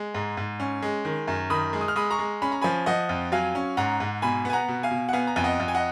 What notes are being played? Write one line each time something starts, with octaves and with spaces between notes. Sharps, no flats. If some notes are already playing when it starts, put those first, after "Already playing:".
Already playing: G#3
G#2
G#2
C#4
G#3
D#3
F#2
D#3 B5 D#6
G#3
D#6
F6
G#3 B5 D#6
A#5 C#6
G#3
C#4 B5
A#5
F3 G#5 B5
F3 D#5 F#5
F2
F#3 F5 G#5
C#4
G#2 F#5 A#5
G#2
B2 G#5 B5
B3 G#5
F#5 A#5
B2
F5 G#5
B2
F#5
B3 F5 G#5
A#5
F2 G#5
D#5 F#5
F2
G#5
D#5 F#5